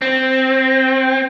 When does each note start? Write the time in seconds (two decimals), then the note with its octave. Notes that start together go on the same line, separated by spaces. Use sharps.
0.02 C4